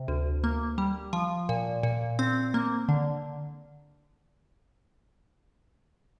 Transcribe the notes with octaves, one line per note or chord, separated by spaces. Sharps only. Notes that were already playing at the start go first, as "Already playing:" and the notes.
Already playing: C3
D2
A#3
G3
F3
A#2
A#2
C4
A#3
D3